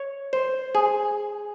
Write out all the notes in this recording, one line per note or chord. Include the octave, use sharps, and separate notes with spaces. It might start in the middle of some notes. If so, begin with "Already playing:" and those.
Already playing: C#5
C5
G#4